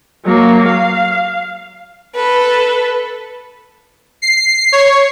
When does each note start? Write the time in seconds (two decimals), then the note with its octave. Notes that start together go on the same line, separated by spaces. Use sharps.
0.25 F#3 A#3
0.68 F5
2.15 A4 B4
4.22 C7
4.72 C#5